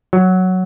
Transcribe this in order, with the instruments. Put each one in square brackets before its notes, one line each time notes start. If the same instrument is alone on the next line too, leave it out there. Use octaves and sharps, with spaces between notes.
[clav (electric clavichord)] F#3